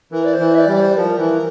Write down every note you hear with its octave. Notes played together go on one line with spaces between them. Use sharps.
E3 A#4
D5
C5
E3
E5
D5
G3
D5
C5
F3 A#4
E3